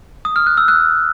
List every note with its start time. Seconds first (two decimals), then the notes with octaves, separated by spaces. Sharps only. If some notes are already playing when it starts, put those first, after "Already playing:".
0.25 D#6
0.36 F6
0.47 F#6
0.57 E6
0.68 F#6